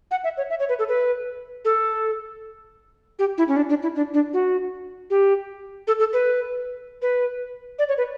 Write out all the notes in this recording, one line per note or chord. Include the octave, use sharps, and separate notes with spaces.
F#5
E5
C#5
E5
C#5
B4
A4
B4
A4
G4
E4
C#4
D4
D4
E4
D4
D4
F#4
G4
A4
A4
B4
B4
D5
C#5
B4